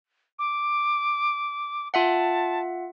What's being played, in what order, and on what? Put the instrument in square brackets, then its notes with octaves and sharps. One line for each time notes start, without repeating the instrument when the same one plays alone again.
[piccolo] D6
[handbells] F4 E5 F#5 [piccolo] A5